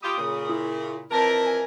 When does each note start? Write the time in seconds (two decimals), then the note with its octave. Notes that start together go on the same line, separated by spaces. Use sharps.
0.02 G3 F4 G4 D#6
0.17 A#2 C#3
0.50 E4
1.11 F2 E3 A#4 A5
1.46 G#5